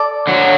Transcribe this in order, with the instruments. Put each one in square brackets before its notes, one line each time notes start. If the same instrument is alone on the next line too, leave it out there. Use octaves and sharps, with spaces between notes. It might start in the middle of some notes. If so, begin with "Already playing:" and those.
Already playing: [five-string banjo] A4 D5
[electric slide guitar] D3 F#3